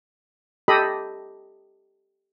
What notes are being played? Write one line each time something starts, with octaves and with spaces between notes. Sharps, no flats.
G4 A4 D#5 B5